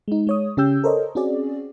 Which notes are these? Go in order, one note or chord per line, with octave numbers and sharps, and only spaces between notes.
G#3 D#4
G#3 C#5 D#6
C#3 C#4 G4 G5 E6 G6
A4 A#4 C5 C#5 D#5
C4 C#4 F#4 G#4 D5